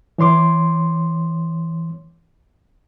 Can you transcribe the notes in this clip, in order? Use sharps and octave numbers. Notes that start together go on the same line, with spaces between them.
E3 C#5 C6 D6